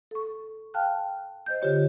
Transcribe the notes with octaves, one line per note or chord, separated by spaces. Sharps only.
A4 C#6
F5 G5 A5 F6 F#6
C5 D#5 G6
D3 F4 G4 C#5